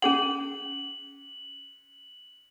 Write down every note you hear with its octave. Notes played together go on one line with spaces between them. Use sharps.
C#4 G#4 F#5 F#7